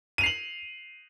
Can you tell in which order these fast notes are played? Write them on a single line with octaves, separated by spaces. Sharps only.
D#7 F7 C7 F#7